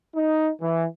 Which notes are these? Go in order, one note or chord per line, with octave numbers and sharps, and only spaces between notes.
D#4
E3